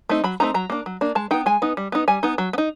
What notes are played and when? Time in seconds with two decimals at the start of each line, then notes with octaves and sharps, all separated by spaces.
0.09 A3 C4 D#4
0.24 F#3 B5
0.40 A3 C4 D#4 A#5
0.54 F#3 A#5
0.70 A#3 D4
0.86 F#3
1.01 A#3 D4
1.15 G#3 A5
1.31 B3 D#4 G5
1.46 G#3 G#5
1.62 B3 D#4
1.77 G3
1.92 B3 D#4
2.08 G3 G#5
2.23 B3 D#4
2.38 F#3
2.53 B3
2.58 D#4